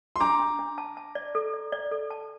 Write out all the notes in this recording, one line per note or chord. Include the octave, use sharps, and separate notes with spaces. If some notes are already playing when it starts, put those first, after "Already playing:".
C6
D4 A#5 D6
D4
D4
A5
A5
D5
A4
D5
D5
A4
A5